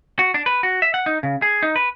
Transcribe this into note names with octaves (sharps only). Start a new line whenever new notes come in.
F#4
D4
B4
F#4
E5
F#5
D#4
C#3
G#4
D#4
B4